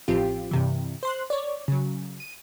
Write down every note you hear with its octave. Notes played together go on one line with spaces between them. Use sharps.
A1 F3 C4 F4 G4
G2 C3 E3
C5 C6 F#6
C#5 D5
C#3 F#3
D#7